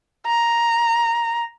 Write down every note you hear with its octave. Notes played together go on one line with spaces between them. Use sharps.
A#5